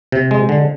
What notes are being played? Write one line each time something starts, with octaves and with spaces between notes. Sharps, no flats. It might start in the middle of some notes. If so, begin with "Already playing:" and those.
C3
G#3
D3